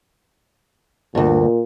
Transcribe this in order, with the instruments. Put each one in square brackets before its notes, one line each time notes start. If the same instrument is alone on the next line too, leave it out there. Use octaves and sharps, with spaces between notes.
[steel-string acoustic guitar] D2 G2 [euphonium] A#2